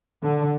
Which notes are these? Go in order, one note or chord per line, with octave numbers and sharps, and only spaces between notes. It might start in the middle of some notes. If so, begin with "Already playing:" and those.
D3